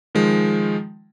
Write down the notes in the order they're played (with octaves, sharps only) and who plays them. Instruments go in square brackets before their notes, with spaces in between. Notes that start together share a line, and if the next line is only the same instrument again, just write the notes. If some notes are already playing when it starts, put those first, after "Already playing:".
[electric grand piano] D#3 F3 G#3